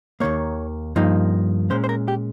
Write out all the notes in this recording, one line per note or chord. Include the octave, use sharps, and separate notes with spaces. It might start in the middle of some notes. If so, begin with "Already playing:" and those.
D#2 D#3 A#3 C#5
G2 F3 A#3 D#4
A#2 G#3 C#4 C5
C5
A#4
G4